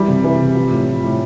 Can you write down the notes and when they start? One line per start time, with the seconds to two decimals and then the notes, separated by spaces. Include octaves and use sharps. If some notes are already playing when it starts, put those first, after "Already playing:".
Already playing: E3 G3
0.08 C3
0.24 E3
0.39 C3
0.55 F3
0.71 A2
0.87 F3
1.03 A2